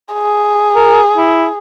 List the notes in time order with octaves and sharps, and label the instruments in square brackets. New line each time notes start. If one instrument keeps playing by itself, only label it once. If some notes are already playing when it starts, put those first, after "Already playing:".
[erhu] G#4
[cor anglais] A#4
E4